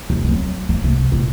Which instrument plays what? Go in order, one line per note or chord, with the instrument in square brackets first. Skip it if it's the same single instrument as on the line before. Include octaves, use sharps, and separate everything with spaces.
[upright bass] D#2
F#3 C4
A#3
C2
A#1 F4